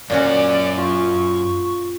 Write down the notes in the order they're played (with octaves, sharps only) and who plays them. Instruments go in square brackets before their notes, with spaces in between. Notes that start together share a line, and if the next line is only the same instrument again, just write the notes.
[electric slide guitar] F#2 C#5 [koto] A#2 C#4 F#4 [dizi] D5
[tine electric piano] F4 [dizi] C#6